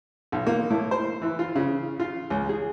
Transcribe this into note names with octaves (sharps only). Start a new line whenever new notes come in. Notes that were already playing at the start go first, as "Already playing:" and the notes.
B1
A#3
A2
C5
E3
F4
C#3
F4
C#2
G#4